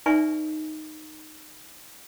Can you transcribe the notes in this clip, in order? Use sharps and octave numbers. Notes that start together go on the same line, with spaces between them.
D#4 B4 D5 E5 G#5 C#6